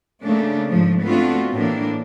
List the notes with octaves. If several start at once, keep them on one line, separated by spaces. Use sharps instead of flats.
C#3 A3 A#3 D4
G#2 F3 A3
A3 B3 C4 D4 F4 F#4
A2 E3 A#3 D4